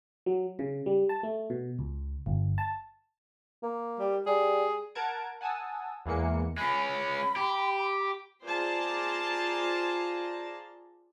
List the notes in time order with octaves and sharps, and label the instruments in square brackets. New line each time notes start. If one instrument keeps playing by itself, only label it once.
[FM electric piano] F#3
C#3
G3
A5
A3
B2
C#2
G1
A5
[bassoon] A#3
[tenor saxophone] G3
[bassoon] G3 [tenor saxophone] G#4
[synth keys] A#4 F#5 A5 A#5 G#6 D7
F#5 G#5 A5 D#6 E6
E2 E3 G#3 A#3 C#7
[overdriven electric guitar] G#3 C#4 [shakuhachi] B5
[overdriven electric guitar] G4
[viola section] F4 G#4 C5 D5 A5 A#5